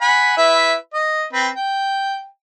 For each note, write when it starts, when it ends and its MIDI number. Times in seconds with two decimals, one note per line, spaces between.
0.01 0.36 78
0.01 0.36 80
0.01 0.36 83
0.37 0.75 64
0.37 0.75 71
0.37 0.75 76
0.94 1.25 75
1.33 1.48 60
1.33 1.48 71
1.55 2.25 79